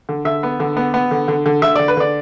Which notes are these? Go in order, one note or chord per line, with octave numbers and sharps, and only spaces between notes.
D3
D3 E5
B3
D3
B3
B3
D3
D3
D3
D3 E5
D3 D5
B4
D3 D5